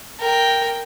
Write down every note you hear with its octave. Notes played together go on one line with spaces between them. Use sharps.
A#4 G5